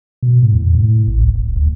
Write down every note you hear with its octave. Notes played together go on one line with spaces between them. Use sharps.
B2
A2
E2
A2
A1
C#2
D#1
D2